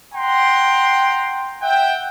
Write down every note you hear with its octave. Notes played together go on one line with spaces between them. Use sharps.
F#5 G5 A#5 C6
E5 F#5 G5